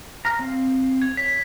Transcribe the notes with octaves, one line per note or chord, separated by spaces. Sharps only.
A#5 F6
C4 F5
G#6
C#5 B6